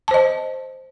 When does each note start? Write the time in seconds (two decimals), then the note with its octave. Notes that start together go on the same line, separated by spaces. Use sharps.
0.08 A5
0.11 C5
0.14 D#5